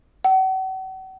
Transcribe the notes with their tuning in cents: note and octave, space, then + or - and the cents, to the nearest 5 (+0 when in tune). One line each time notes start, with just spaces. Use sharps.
F#5 +40